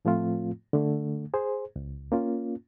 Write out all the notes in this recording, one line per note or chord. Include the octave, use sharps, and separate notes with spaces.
A2 F3 A3 C4 F4
D3 A3
G#4 C5
C#2
A#3 C#4 F4